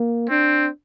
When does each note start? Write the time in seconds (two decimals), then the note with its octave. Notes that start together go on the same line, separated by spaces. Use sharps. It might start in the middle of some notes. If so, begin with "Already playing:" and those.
Already playing: A#3
0.30 C4 D4